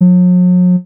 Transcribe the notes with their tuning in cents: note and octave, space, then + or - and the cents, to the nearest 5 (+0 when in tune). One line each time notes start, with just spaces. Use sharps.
F#3 -45